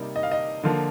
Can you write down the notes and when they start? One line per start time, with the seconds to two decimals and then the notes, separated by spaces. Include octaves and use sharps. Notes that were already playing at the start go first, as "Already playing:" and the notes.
Already playing: C3 G3 A#3 D#4 D5
0.16 D#5
0.23 F5
0.31 D#5
0.63 D3 F3 A#3 F4